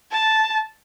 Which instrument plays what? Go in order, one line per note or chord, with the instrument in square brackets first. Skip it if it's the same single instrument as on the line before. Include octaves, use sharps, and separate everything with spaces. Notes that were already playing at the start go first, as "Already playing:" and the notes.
[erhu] A5